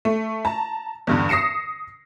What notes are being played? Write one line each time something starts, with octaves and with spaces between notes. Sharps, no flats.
A3
A5 A#5
E2 G2 D3
D#6 A#6 C7 C#7 E7